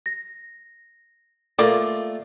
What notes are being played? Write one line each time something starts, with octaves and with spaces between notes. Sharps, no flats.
A#6
A3 A#3 F4 A4 D5